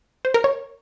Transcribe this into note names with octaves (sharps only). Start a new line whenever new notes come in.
C5
A#4
C#5